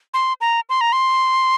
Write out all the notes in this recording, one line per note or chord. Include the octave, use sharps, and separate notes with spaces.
C6
A#5
C6
A#5
C6